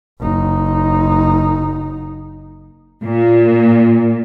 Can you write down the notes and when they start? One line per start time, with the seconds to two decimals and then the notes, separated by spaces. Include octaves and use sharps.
0.20 F#1 D#4
3.03 A#2